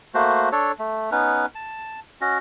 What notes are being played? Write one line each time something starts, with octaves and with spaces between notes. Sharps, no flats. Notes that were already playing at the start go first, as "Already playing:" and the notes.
A3 A#3 F#4 C5
D4 A4 C#5
A3
B3 C#4 D#4 B4
A5
C#4 F#4 D#5